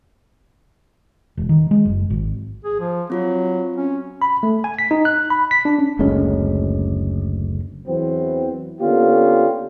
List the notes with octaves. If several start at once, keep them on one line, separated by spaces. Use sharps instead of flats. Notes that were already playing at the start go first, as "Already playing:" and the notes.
E1
D#3
G#3
F#1
G#1
G#4
F3
F#3 C4 F4 F#4
C#4
B5
A3
G#5
B6
D#4
F#6
B5
B6
D4
C#4
F#1 D2 G#3 C#4
E2 E3 F#3 B3 C4
D3 A#3 B3 C#4 F4 G4